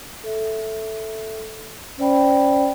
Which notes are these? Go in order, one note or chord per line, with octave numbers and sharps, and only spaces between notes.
A4 E5
C#4 C5 D5 G5 B5